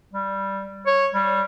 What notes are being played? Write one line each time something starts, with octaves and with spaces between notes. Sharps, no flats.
G3
C#5
G3